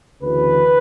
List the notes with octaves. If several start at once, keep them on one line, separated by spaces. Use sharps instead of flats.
D2 C#3 E3 B4